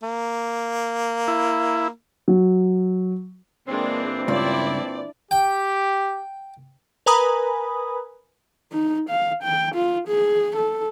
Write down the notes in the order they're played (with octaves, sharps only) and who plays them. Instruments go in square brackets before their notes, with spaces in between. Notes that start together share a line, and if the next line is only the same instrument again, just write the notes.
[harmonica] A#3
[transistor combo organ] E4
[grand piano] F#3
[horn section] A#2 E3 C4 [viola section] G#3 A#3 D4
[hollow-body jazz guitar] C#2 G2 [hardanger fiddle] D4 E4 [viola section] D5
[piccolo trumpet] G4 [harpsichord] G5
[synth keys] A#4 B4 G#5 A#5 B5 D#6
[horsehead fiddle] D#4
F5
G5
F4
G#4
A4